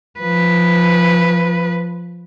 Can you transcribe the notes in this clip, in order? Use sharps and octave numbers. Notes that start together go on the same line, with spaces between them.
F3 B4